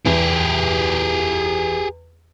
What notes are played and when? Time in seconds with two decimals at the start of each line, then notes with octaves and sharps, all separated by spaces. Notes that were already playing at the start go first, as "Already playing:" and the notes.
0.05 E2 G4 G#4